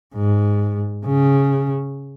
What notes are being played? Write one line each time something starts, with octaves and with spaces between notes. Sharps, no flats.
G#2
C#3